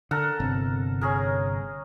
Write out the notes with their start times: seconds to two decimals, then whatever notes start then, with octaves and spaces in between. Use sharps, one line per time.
0.11 D3 A4 A#4 F#5
0.40 G1 C3
1.01 C#4 G#4 A#4